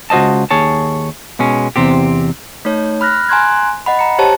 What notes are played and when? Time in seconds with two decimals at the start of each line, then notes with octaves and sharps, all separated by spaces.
0.10 C#2 F#4 C5 D#5 A5
0.51 D#2 G#4 C#5 A5
1.39 B2 G#3 C#4
1.76 E2 C3 C4 G4
2.65 A3 D#4 C#5
3.01 B5 F6 F#6 A#6
3.29 G#5 A#5 C6 F#6 G#6
3.86 D#5 F#5 B5
3.99 A#5 C#7
4.19 G4 C5 C#5 A5